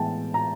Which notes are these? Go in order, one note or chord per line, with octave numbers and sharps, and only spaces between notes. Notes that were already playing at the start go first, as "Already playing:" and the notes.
Already playing: A2 E3 G#3 B3 G5 A5
A#5